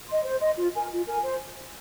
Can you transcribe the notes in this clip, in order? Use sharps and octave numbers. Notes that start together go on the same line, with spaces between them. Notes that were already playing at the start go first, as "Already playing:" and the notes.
D#5 C6
C5
D#5 C6
F4
A#4 G#5
F4
A#4 G#5
C5